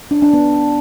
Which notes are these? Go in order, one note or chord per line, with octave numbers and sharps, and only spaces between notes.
D4
D4
B3